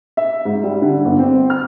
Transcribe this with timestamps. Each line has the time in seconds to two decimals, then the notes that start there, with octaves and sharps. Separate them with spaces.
0.17 E5
0.45 G#2
0.64 G3
0.82 D3
1.05 G1
1.18 C4
1.50 F6